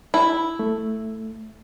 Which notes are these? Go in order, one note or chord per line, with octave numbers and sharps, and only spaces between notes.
E4
A3